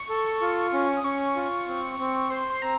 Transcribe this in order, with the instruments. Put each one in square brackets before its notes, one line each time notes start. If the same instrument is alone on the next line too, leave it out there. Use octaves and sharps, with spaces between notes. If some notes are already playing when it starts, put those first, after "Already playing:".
Already playing: [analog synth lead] C#6
[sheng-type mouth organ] A4
F4
C#4
[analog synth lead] D#6
[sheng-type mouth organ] C#4 [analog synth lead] C#6
[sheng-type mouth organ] F4
C4
C4
[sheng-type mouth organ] C5 [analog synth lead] C6
[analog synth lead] C6
[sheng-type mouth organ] C4 [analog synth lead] A#5